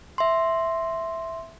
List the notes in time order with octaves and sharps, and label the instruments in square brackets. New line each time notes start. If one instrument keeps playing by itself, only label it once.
[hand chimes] E5 C6